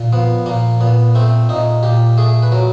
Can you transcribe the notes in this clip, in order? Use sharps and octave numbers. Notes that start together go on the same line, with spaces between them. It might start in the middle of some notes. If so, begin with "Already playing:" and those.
Already playing: A#2
F3 B3
A#2 A#3
A#2 B3
A3 C4
A#2 D#4
A#2 G4
A3 G#4
B4
F#3 A#4